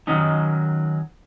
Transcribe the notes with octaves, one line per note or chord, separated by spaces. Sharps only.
D#3 F#3 C#4 D#4